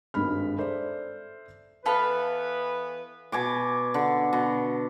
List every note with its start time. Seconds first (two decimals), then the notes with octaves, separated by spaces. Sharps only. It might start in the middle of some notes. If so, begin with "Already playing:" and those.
0.14 G#1 G2 G#3 B5 F6
0.58 A4 C5 D5 E5
1.85 E3 B3 A4 B4 F5 B5
3.32 B2 G#5 D6
3.94 D3
4.33 B2